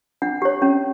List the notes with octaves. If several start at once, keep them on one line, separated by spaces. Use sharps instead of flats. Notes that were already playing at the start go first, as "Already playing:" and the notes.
D4 F#5
G4 C#5
C#4